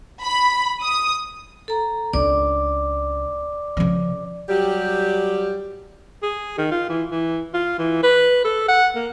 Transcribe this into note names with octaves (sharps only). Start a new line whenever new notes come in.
B5
D#6
A4 A#5
C#2 D4 D5 D6
C#3 F3
F#3 G3 G4
G#4
D#3
F4
E3
E3
F4
E3
B4
A4
F#5
A#3